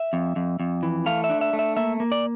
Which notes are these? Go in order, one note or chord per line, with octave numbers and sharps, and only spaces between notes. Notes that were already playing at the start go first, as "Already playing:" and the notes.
Already playing: E5
F2
F2
F2
E3
A3 F5
E5
D4
E5
A3
E5
A#3 E5
A#3
D5